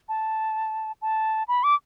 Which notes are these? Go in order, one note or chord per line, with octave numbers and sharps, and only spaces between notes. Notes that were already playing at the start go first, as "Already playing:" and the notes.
A5
A5
B5
D6